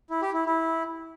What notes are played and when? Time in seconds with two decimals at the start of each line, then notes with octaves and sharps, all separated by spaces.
0.10 E4
0.22 G4
0.34 E4
0.45 E4